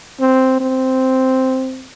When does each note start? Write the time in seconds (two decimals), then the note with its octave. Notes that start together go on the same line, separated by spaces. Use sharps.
0.20 C4
0.60 C4